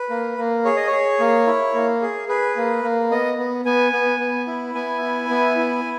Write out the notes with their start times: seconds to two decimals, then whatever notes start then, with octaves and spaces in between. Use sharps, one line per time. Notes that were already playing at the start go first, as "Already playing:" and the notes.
Already playing: B4
0.10 A#3
0.38 A#3
0.65 G#4 C#5
0.76 D#5
0.87 G#4 C#5
1.20 A#3
1.47 E4
1.74 A#3
2.02 G#4
2.29 G#4 B4
2.56 A#3
2.83 A#3
3.11 B3 D#5
3.38 B3
3.65 B3 G#5
3.92 B3
4.20 B3
4.47 E4
4.75 B3 G#5
5.02 E4
5.30 B3
5.57 E4